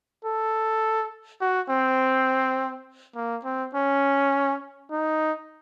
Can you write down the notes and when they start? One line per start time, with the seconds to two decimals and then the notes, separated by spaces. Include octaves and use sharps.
0.25 A4
1.41 F#4
1.70 C4
3.16 A#3
3.45 C4
3.75 C#4
4.91 D#4